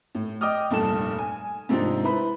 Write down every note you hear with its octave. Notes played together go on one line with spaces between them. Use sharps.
A2
D#5 G5 D6 D#6 F6
F1 G2 A#2 A4 E7
G#5
G#2 C3 F3 C4 D4 D#4
E4 B4 C5 B5